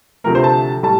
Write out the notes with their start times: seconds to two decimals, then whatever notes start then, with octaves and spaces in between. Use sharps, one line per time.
0.24 D2 C3 F3 A3 A#4
0.35 C5
0.44 A5
0.83 A2 G3 A5